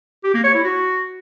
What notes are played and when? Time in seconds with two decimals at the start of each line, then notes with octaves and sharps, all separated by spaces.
0.24 G4
0.34 A#3
0.44 C#5
0.54 E4
0.64 F#4